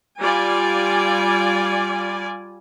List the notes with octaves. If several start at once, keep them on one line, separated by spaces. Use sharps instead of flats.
G3 F4 D5 G#5